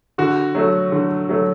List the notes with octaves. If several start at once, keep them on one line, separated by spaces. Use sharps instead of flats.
D3 F#4
F#3 A3
D3
F#3 A3